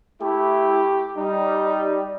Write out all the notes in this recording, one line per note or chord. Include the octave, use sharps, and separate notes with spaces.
A3 E4 G4
G3 D#4